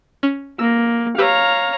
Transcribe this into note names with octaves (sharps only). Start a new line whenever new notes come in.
C#4
A#3 E6
G4 B4 C#5 F5 A#5 E6